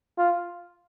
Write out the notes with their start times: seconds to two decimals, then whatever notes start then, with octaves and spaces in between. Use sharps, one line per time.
0.18 F4